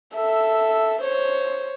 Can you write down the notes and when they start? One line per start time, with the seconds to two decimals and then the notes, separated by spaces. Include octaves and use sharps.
0.15 A4 E5
1.02 C5 C#5